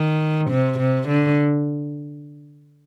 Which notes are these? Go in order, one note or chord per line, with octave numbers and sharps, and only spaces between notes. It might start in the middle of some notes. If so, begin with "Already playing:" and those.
Already playing: D#3
C3
C3
D3